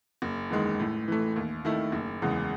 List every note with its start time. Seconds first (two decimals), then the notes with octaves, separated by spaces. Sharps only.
0.22 F#1
0.50 E2 D#3 G#3
0.79 A2
1.08 E3 A3
1.36 D#2
1.65 D#3 A3 E4
1.92 F#1
2.22 E2 C#3 G#3